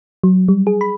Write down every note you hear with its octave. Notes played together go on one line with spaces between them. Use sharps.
F#3
G3
G#4
B5